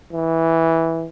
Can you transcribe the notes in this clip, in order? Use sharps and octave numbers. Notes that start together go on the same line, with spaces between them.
E3